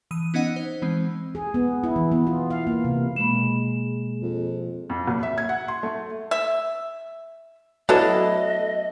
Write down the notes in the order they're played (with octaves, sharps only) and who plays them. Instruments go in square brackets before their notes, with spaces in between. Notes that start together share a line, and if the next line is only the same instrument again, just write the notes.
[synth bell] E3 D#6 D#7
B3 C#4 D#4 D#5 F#5
C5
E3 G#3 C4
[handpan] G#4
B3
E4
E3
B3
F4
F5
A#3
C3
[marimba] B2 A#3 B5 [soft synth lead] G#3 [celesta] E7
[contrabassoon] F2
[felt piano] F2
F#1
E5
G#6
F#5
C6
A3
[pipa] E5
[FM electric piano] F#3 A3 [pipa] B3 D4 E4 [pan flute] D#5